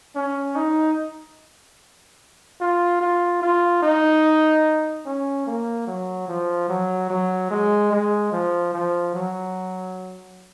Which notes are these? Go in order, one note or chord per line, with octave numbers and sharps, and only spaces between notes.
C#4
D#4
F4
F4
F4
D#4
C#4
A#3
F#3
F3
F#3
F#3
G#3
G#3
F3
F3
F#3